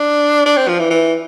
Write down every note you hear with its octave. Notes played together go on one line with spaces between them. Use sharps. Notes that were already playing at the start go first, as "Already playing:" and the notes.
Already playing: D4
D4
C4
F3
E3
E3